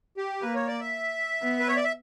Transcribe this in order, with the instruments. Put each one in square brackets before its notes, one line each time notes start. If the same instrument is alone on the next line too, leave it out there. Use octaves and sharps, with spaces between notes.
[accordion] G4
[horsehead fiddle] A#3 [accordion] B4
[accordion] C#5
D5
E5
[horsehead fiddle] B3
[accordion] B4
C#5
D5
E5